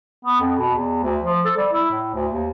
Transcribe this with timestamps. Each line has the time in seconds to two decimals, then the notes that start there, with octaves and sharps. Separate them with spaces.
0.25 B3
0.40 F2
0.59 B2
0.75 E2
1.03 D2
1.23 F3
1.45 A4
1.57 G3
1.72 E4
1.91 A2
2.15 D2
2.31 D#2